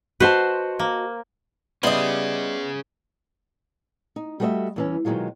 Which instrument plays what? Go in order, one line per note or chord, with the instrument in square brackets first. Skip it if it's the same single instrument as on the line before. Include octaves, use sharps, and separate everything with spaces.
[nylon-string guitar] F#4 D#5 A5 [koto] B4 C5
[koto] A#3
[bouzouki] G3 D#5 [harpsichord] B3 E4 C6 [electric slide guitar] C#4 G#4
[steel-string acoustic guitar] D#4
G3 A3 F#4 B4 D#5 E5
E2 E3 C#4
B2 D#3 E3 F#3 G#3 F4